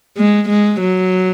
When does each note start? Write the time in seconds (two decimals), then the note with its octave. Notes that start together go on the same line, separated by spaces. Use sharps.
0.17 G#3
0.49 G#3
0.81 F#3